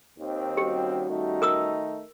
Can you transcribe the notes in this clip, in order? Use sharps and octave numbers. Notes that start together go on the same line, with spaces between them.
D#2 D#3 C4
G3 C#4 F#4 G4
D#3 A3 D#4
A#4 D#6 E6